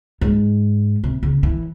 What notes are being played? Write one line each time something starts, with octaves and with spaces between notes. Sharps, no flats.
G#2
C3
C#3
E3